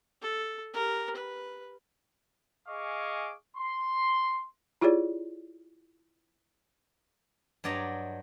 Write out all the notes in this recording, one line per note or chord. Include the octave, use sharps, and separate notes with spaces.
A4
G4 A#4
B4
G#4 D#5 F5 G#5 C#6 D6
C6
E4 F4 G4 G#4 C#5 D5
G2 F#3 D5 D#5 A#5